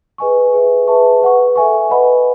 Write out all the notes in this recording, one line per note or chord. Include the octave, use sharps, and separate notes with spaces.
G#4 B4 D#5 G#5 C#6
G#4 B4 E5
G#4 B4 E5 A5 C#6
B4 F#5 C#6
A4 E5 G#5 C#6
B4 D#5 F#5 B5